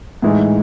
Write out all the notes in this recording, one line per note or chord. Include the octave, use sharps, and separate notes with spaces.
A2 E3 G#3 D#4